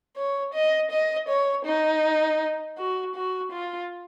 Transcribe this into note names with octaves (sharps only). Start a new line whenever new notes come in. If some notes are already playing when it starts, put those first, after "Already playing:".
C#5
D#5
D#5
C#5
D#4
F#4
F#4
F4